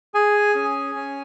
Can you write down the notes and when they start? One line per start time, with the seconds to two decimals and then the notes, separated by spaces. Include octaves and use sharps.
0.14 G#4 G#5
0.55 C#4
0.95 C#4